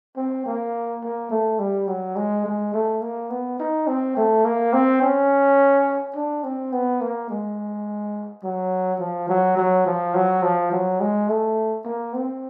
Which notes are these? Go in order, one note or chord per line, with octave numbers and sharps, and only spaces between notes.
C4
A#3
A#3
A3
G3
F#3
G#3
G#3
A3
A#3
B3
D#4
C4
A3
A#3
C4
C#4
D4
C4
B3
A#3
G#3
F#3
F3
F#3
F#3
F3
F#3
F3
F#3
G#3
A3
A#3
C4